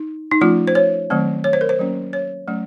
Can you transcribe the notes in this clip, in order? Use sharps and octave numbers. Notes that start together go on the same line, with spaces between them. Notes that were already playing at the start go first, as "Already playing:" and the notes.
Already playing: D#4
D#4
F3 A3 C#4 F4
C5
C#5
D#3 F#3 A3 C4
C#5
C5
A#4
C5
F#3 A#3 C#4
C#5
F#3 A3 C#4